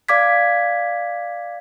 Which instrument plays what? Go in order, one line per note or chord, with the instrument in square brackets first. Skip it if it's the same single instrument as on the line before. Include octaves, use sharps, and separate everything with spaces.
[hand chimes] D5 F5 D6 G#6 B6